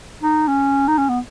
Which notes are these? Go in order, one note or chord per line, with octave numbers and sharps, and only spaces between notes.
D#4
C#4
D#4
C#4
B3